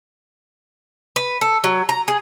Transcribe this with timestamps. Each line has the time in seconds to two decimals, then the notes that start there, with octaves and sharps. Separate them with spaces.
1.16 B4
1.41 A4
1.64 F#3
1.89 A#5
2.08 G#4